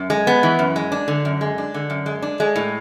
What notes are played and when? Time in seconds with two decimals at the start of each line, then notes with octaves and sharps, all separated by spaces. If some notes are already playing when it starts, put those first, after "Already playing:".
Already playing: F#2
0.10 G#3
0.27 B3
0.43 E3
0.59 F#2
0.76 G#3
0.92 D4
1.08 D3
1.25 F#2
1.41 G#3
1.58 D4
1.74 D3
1.90 F#2
2.06 G#3
2.22 D4
2.40 G#3
2.56 A2